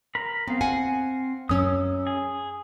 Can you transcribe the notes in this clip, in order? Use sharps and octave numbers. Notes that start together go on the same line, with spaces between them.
A#4 A#5 B5
B3 C4 F5
F#5 G#5
F#2 C#4 D#6 E6
G#4